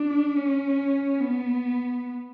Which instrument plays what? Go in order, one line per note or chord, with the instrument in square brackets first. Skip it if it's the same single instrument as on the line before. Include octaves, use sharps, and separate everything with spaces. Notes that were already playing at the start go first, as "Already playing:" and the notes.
Already playing: [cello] D4
C#4
B3